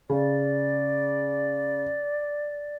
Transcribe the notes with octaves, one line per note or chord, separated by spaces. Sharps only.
C#3 D5